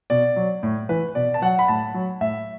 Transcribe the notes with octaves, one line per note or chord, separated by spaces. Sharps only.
B2 D5
F#3
A2
E3 B4
B2 D5
A5
F#3 F#5
B5
A2 A5
F#3
A2 E5